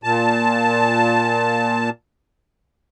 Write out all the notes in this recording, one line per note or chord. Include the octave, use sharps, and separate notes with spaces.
A#2 A5